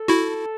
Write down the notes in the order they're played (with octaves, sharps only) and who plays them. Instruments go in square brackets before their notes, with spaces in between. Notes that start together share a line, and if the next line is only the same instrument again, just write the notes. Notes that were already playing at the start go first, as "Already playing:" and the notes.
Already playing: [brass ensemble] A4
[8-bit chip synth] E4 F#4